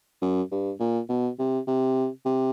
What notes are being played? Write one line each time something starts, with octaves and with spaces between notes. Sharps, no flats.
F#2
G2
A#2
B2
C3
C3
C3